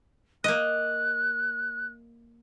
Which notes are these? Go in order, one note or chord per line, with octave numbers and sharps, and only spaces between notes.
A#3 D#5 F#6